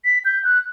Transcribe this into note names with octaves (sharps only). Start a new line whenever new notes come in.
B6
G6
F#6